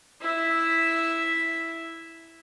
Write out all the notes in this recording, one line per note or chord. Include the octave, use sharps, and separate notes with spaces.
E4 E5